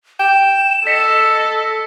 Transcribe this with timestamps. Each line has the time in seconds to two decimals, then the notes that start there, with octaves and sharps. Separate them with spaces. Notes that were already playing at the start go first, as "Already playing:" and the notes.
0.20 G5 E7
0.87 A4 D#5 B6 C#7